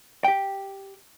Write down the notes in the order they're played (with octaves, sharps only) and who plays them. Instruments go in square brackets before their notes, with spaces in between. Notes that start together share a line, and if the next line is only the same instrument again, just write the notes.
[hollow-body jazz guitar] G4 G5